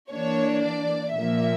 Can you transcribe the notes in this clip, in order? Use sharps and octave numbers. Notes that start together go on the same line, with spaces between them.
E3 A#3 D4 C#5
D5
A#2 F3 A#3 E5